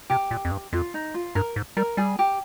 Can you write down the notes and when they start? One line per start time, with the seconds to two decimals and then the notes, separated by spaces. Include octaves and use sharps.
0.10 C3 G4
0.31 A#2
0.45 F2
0.51 G2
0.73 F2 F4
0.94 D#4
1.14 F4
1.35 G2 A#4
1.56 G#2
1.77 G3 A#4
1.97 G3 G#4
2.19 G4